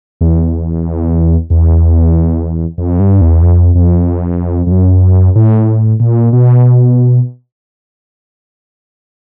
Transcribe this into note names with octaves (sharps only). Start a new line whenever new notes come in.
E2
E2
F2
G2
E2
F2
F2
F2
F#2
A2
A#2
B2